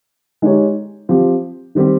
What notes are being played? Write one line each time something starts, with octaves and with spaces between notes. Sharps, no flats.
G#3 D#4 G4 C#5
F3 C4 G4
D#3 G3 C4 G4